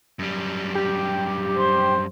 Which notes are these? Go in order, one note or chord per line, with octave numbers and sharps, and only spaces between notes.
F#2 G3
G4
C5